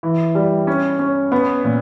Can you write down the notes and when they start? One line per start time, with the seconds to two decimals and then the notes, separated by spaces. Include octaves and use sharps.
0.03 E3
0.35 G3
0.67 C#4
0.99 C#4
1.32 B3
1.64 A#2